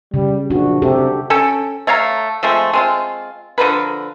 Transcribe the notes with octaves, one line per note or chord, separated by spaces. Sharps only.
C#3 G3
A#1 D4 F#4
C3 G4 A4
C#4 A4 G5
A3 C#5 F5 A#5
F3 G#3 A3 C4
G#3 C4 F4
D3 F3 A#4 B4